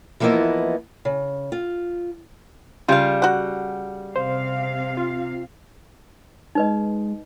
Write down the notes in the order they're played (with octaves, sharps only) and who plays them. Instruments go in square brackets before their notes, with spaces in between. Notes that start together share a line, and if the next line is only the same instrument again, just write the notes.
[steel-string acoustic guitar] E3 F3 A#3 B3 E4 D#5
C#3
F4
[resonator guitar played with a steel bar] C#3 G3 [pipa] F4 F5
[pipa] F#4 F#5
[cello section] C3 F5 [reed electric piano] C5
[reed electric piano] F4
[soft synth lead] G#3 [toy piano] D#4 B4 D#5